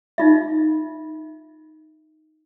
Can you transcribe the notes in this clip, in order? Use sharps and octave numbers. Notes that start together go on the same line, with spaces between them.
D#4 F4 E5